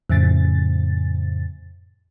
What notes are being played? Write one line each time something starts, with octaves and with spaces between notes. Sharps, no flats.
F2 A2 C#3 A6